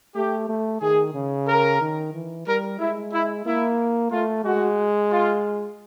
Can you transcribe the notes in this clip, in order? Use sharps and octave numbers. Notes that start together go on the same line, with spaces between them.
A3 G4
A3
D#3 G#4
C#3
A#4
D#3
E3
G3 A#4
G#3 E4
E4
A#3 E4
A3 F4
G#3 F#4
F4